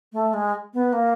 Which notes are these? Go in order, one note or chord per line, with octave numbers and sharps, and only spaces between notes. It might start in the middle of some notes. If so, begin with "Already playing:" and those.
A3
G#3
B3
A#3